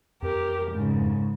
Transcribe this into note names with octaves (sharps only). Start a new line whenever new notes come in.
F2 G4 A#4
G#2 C#3